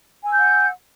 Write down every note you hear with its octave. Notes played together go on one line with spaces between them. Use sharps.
F#5 G#5 E6 G6